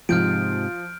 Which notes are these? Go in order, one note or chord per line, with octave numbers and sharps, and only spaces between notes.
G#2 C3 F3 F6 G6 D7